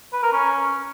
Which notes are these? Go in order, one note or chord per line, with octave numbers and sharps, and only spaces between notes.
B4
A#4
C#4